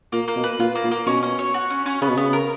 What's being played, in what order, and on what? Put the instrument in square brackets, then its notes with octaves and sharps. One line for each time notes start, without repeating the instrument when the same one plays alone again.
[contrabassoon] A#2 [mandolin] A#3
[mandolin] A#3
[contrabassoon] B2
[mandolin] B4
[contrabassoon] A#2 [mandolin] F4
[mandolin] A#3
[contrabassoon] A#2
[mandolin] A#3
[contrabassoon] B2 [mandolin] C#4
[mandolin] C#4
C#5
F#4
C#4
C#4
[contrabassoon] C#3 [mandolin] B3
[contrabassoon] B2
[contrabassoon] C#3 [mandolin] B3
[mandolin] A#4